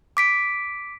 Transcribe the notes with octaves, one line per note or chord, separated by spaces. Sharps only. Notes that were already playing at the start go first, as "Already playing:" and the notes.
D6 B6 D7